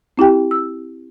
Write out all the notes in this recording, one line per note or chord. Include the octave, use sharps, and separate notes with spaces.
C4 E4 G4 G5
E6